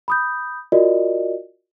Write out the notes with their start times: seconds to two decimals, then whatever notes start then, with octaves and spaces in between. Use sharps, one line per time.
0.08 B5 D#6 G6
0.72 F4 F#4 A#4 D5 D#5